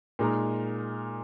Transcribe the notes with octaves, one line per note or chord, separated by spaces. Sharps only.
A#2 G#3 D#4 A#4